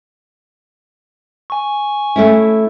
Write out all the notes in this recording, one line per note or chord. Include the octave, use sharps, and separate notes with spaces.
G#5 C#6
A3 C#4 E4